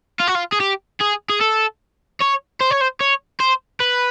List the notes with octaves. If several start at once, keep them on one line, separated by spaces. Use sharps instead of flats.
F4
F#4
F4
G#4
G4
G#4
G#4
A4
C#5
C5
C#5
C5
C#5
C5
B4